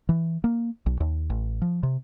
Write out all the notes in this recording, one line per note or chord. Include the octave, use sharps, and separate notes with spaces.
E3
A#3
B1
D#2
A1
F3
C3